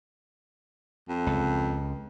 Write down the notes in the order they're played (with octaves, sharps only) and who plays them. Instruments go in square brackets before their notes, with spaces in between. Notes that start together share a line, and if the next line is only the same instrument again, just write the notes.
[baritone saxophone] F2
[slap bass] C#2